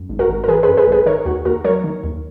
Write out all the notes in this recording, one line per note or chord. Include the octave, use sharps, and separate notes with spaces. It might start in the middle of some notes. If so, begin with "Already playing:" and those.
Already playing: F#2
G#1
F#4 A#4
G#1
A#4
E3 G#4 B4
F#2 G#4 B4
G#4 B4
G#1
G#4 B4
D#3 A#4 C#5
D#2 F#4
D#2 F#4 A#4
F#3 A#4 C#5
D#3
D#2